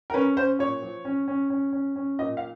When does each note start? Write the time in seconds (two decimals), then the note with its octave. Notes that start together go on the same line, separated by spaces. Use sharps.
0.10 A#4
0.14 C#4 B4
0.37 C#4 C5
0.59 A#2 C#5
0.82 F3
1.05 C#4
1.28 C#4
1.50 C#4
1.73 C#4
1.96 C#4
2.19 A#2 D#5
2.37 F5